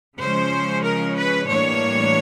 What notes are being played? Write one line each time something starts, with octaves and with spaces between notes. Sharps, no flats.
C#3 F3 G#3 C#4 C5
A#4
B4
A2 E3 G3 A#3 D4 C#5